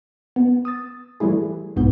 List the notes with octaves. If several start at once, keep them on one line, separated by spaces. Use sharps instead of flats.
B3
D#6 E6 A6
E3 G3 A3 E4 G#4
B1 G#2 B3 G6